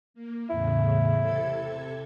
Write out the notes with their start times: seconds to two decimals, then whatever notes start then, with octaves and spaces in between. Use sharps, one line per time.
0.14 A#3
0.50 E2 A2 C#3 E4
1.19 C3 A4 G#6